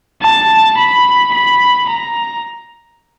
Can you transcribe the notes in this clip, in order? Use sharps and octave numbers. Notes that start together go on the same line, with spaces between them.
A5
B5
B5
A#5